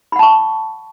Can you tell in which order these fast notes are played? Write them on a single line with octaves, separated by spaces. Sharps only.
B5 F#5 A5 C#6